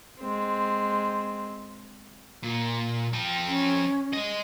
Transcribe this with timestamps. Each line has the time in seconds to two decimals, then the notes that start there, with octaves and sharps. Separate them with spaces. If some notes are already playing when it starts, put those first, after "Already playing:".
0.20 G#3 C4
2.43 A#2
3.13 F3 G5
3.48 C#4
4.13 G#3 D#5